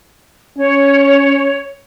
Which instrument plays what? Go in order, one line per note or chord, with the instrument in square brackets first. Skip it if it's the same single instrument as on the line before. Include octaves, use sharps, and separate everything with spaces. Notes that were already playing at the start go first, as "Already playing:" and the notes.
[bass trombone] C#4 [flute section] C#5